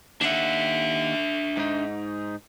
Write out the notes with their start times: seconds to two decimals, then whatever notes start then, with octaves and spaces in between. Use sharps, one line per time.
0.21 D#2 D4 E5 F#5
1.57 G#2 D#4